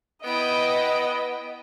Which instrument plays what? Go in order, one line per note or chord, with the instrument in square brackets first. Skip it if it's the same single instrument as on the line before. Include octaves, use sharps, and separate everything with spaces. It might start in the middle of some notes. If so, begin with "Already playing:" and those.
[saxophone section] B3 [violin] E4 G5 [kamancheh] D#5